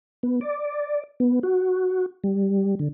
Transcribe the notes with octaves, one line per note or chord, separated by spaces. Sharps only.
B3
D5
B3
F#4
G3
D3